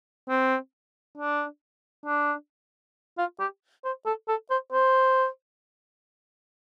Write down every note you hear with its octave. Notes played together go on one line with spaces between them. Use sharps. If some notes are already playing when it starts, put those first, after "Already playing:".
C4
D4
D4
F4
G4
C5
A4
A4
C5
C5